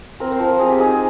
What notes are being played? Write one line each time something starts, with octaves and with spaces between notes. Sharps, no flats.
C4 A#4
C5
F3 A#4
C4 G#4
G4
D#4 G#4